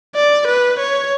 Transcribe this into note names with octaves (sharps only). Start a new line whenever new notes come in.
D5
B4
C#5